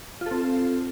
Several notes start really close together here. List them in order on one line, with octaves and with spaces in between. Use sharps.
F4 A4 C4